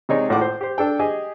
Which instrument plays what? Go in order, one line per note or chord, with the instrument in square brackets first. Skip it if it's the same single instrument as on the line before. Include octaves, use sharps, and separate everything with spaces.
[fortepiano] C3 G#3 D#4 G#4 C#5 D5
G#1 A2 F4 F#5 D6
C5
G4 C5
D4 A4 G5
G4 G#4 D#5 G#5